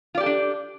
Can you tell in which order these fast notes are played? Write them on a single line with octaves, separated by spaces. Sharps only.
F4 D5 G4 A4 D4